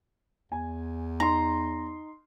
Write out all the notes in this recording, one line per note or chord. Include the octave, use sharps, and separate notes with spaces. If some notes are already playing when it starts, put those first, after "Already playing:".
E2 G#5
D#4 A#5 C6